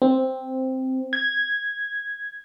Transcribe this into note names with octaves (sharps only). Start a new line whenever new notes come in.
C4
G#6